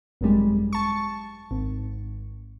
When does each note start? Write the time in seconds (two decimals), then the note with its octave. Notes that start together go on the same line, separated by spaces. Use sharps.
0.21 G#1 F#2 G3 G#3
0.73 A5 C#6
1.51 G#1